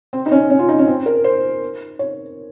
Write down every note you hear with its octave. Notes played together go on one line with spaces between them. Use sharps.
C4
D#4
C#4
C#4
F4
D#4
C#4
C4
A#4
C5
C#5